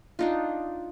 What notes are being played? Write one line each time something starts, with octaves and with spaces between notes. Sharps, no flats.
D4 D#4 F4